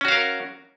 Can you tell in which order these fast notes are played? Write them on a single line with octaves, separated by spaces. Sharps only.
C#4 F#4 F5 A#4